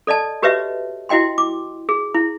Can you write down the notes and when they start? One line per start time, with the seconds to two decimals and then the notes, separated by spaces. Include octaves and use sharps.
0.07 A4 D5 D#5 A5
0.42 F#4 G4 B4 C#5 D#5 E5
1.09 E4 F#4 D#5 G5 C6
1.38 D6
1.89 G#4
2.15 E4